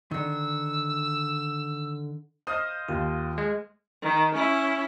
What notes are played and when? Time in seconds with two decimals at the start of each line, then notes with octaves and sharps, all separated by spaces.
0.11 D3 D#3 E6
2.47 C5 D#5 F5 D#6
2.88 D#2 F4
3.38 G#3
4.02 D#3
4.35 C#4 E4